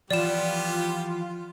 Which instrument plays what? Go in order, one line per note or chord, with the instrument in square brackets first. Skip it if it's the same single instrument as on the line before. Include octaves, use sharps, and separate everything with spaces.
[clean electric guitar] E3 F3 [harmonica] G3 B3 G4 [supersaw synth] F4 [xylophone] D5 E7